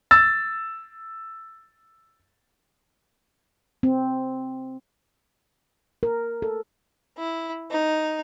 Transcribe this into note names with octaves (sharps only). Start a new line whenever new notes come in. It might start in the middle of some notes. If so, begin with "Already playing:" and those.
E6 A6
C4
A#4
A4
E4
D#4